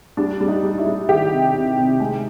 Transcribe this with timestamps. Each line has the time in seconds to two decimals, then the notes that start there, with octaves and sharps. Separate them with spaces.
0.17 G3 D4
0.41 G3
0.48 D#4
0.63 G3
0.78 E4
0.86 G3
1.09 D#3 G4
1.32 C3
1.54 C3
1.77 C3
2.00 G#3